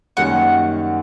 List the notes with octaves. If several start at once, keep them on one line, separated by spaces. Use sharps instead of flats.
F#2 D#3 G3 A#3 C#4 F#5